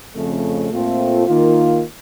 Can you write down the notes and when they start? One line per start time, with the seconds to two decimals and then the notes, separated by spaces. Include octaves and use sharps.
0.15 F2 C#3 A3
0.71 A#2 A3 C4 F4
1.26 D#3 A#3 F4